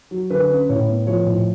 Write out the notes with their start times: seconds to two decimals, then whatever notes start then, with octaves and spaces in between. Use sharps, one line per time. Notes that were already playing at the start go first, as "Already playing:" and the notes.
0.11 F#3
0.30 D3 B4
0.50 C#4
0.69 A2 C#5
0.88 B3
1.07 F3 C#5
1.26 A2